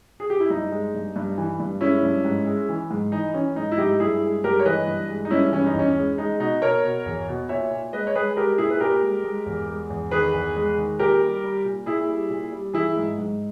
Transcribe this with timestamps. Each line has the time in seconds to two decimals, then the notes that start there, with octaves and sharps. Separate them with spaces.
0.20 G#4
0.30 G4
0.40 E4
0.50 G2 D#4
0.72 G#3
0.94 G2
1.16 G2
1.38 E3
1.60 G2
1.81 G#3 C#4 E4
2.03 G2
2.25 G#2
2.46 G#3
2.69 E3
2.91 G#2
3.12 E3 D#4
3.34 E3 C#4
3.56 G#2 D#4
3.72 E4
3.78 G#2 D#4 G4
4.00 G2 E4 G#4
4.22 G#3
4.44 G2 G4 A#4
4.60 C#5
4.65 E3 B4 D#5
4.87 G2
5.09 G#3
5.25 D#4
5.31 G2 C#4 E4
5.52 E3 C#4
5.66 D#4
5.74 E2 C#4
5.97 G#3
6.18 G#3 D#4
6.40 B2 D#4
6.62 B2 A#4 C#5
6.84 B2
7.06 E2
7.28 B2
7.49 A#2 C#5 E5
7.71 A#2
7.93 G#3 B4 D#5
8.07 C#5
8.15 G#3 G#4 B4
8.37 G#3 G4 A#4
8.58 A#2 E4 G#4
8.70 B4
8.80 A#2 G4 A#4
9.02 G#3
9.24 G#3
9.46 E2
9.68 G#3
9.90 E2
10.11 D#3 G#4 B4
10.34 E2
10.56 G#3
10.77 D#3
10.99 A#2 G4 A#4
11.21 G3
11.44 G3
11.65 A#2
11.86 A#2 E4 G#4
12.09 G3
12.30 A#2
12.52 G3
12.73 E3 E4 G#4
12.96 G#2
13.18 G#2